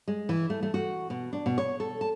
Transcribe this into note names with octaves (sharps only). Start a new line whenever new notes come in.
G#3
E3
A3
A3
F#4
B2
D4
B2
C#5
A4
A5